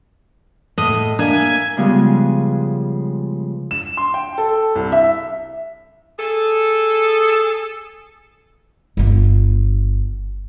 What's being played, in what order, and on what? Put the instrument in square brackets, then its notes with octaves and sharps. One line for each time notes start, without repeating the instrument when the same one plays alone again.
[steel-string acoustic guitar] A2 [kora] D#5
[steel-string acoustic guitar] A#3 [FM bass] D4 [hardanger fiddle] E5 G#5
[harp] C#3 F3 G3 G#3 B3
[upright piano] E7
C6
G5
A4
C2
E5
[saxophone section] G#4 A4
[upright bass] G1 F4